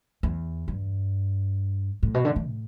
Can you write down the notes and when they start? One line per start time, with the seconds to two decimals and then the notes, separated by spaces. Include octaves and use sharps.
0.23 E2
0.68 G2
2.03 A2
2.14 B2
2.25 D3
2.36 E3
2.48 A2